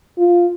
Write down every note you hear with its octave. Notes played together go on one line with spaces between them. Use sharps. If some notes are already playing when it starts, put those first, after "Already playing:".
F4